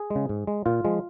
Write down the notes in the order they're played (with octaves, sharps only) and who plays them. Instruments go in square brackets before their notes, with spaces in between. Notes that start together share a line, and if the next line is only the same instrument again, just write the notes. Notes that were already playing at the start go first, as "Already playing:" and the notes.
Already playing: [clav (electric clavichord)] G#4
C#3 G#3
G#2
G#3
A#2 F4
F3 G#3